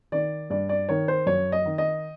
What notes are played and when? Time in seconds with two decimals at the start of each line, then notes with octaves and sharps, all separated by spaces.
0.12 D#3 D5
0.50 G2 D5
0.69 D5
0.89 D#3 C#5
1.08 C5
1.26 F#2 C#5
1.52 D#5
1.66 D#3
1.78 D#5